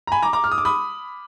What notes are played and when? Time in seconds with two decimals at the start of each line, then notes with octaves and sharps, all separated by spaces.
0.07 A#5
0.12 G#5 B5
0.23 A#5 D6
0.33 A#5 D6
0.44 F6
0.52 D#6
0.58 D6
0.65 B5 D#6